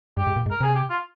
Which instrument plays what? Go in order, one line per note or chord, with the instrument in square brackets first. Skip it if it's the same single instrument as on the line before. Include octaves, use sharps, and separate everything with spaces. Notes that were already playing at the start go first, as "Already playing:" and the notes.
[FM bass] G2 [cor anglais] G4
[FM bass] G#2
A#2
G#2
[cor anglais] A#4
[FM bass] C3 [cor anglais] G#4
[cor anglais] G4
F4